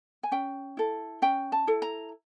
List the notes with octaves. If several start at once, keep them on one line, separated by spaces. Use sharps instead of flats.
G#5
C#4 G5
E4 A4
C#4 G5
A5
E4 A4
A#5